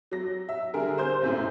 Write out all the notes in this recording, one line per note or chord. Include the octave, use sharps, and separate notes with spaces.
F#3 A#6
E5
D3 G3 G#4 A#4
C5 C6 G6
B1 F#2 A2